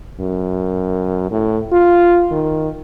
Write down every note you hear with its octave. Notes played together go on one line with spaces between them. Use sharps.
F#2
A2
F4
D#3